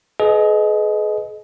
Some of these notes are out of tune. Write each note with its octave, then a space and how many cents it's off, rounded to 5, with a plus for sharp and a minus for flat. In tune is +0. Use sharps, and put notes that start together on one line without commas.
G#4 +40 B4 +20 D#5 +0